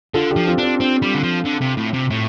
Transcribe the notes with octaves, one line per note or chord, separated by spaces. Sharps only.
D3 F4 A4
D4 G4
F3
C4 F4
C4 D4
C4 D4
G3
D3
F3
D3
C3
A2
C3
A2